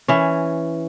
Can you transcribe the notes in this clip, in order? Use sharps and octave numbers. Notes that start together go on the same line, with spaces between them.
E3 C#4